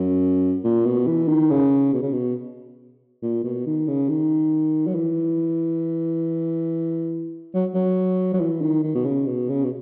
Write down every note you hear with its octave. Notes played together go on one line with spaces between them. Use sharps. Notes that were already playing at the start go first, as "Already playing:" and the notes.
Already playing: F#2
A#2
B2
E3
D#3
C#3
B2
C#3
B2
A#2
B2
D#3
C#3
D#3
F#3
E3
F#3
F#3
F#3
E3
D#3
D#3
B2
C#3
B2
C#3
B2